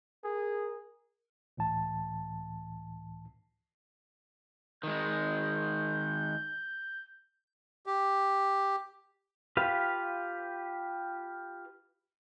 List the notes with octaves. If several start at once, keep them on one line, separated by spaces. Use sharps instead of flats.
G#4 A#4
C#2 A2 E3 A5
D#3 G#3 G6
G4
F4 G4 B4 F5